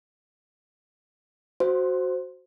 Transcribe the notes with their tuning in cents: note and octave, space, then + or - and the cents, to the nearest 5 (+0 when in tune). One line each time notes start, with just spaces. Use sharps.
F#4 +0 C5 +0